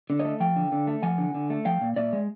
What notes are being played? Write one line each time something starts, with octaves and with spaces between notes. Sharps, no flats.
D3
C#5 D#5
A3
F3 F5 G5
D3
D3
A3
F3 F#5 G#5
D3
D3
A3
F3 F5 G5
A#2
A#2 D5 E5
G#3